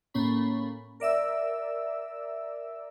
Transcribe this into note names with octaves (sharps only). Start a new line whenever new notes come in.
A2 A#3 C#4 B5
A#4 D5 E5 E6